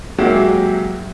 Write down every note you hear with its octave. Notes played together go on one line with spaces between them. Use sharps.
F#3 G#3 A#3 F#4 G4 E5